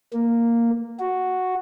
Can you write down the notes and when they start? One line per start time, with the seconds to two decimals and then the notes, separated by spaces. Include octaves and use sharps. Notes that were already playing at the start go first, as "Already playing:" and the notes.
0.13 A#3
1.00 F#4